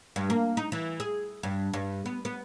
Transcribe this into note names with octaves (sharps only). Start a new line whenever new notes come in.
G2
A#3
D#4
E3
G#4
G2
G2
B3
B3